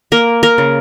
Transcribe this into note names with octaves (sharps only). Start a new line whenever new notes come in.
A#3 A#4
A#4
C#3